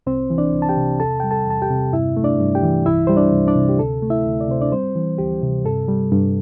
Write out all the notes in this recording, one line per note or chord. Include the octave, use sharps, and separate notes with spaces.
C2 C4 C5
E3
D4 D5
C2
A5
G4 G5
C3
E2 A4 A5
G3 G5
A4 A5
E2 A5
G4 G5
C3
G2 E4 E5
A3
D4 D5
G2
G4 G5
E3
C2 E4 E5
G3 C5
D4 D5
C2
D4 D5
C3
G4
D2 A4
A3
E4 E5
D2
D5
C3 C5
D4 D5
G3 C4 C5
E3
D2 G4
C3
G2 A4
G3
G2